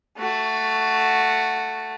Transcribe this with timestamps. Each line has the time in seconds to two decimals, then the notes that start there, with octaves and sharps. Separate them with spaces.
0.18 A3 F#4